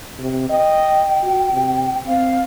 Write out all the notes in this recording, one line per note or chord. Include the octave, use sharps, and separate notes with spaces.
C3
D#5 G5
F#4
C3
C4 F5